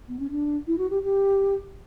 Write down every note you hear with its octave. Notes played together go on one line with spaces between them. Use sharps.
B3
C#4
D4
E4
F#4
G4
G4